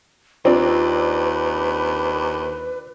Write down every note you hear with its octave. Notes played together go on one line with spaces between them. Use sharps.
D#2 C4 D4 F4 B4